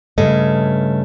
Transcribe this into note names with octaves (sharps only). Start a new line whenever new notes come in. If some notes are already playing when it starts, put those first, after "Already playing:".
G2 C#3 A3 D#5